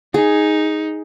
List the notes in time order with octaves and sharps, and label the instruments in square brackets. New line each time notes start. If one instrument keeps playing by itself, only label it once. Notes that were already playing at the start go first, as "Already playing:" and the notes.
[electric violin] D#4 [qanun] G#4